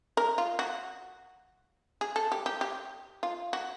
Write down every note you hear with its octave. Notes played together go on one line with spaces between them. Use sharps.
A#4
F4
F#4
G#4
A4
G4
G4
G4
F4
F#4